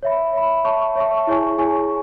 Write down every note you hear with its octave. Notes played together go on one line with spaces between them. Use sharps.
C#5 E5 B5
C#5 E5 B5
C#5 E5 A5 C#6
C#5 E5 A5 C#6
E4 G#4 C#5 G#5 C#6
E4 G#4 C#5 G#5 C#6